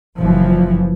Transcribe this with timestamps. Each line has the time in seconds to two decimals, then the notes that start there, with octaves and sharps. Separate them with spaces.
0.18 F#1 E3 F3